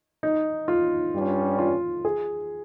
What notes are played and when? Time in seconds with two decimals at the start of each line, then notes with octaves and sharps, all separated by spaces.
0.23 D#4
0.68 F4
1.14 G2 G3 C#4
1.59 F4
2.05 G#4